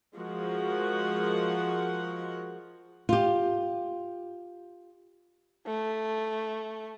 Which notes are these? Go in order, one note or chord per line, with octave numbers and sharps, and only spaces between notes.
F3 G#3 F#4 A#4 F#5
F4 G4
A3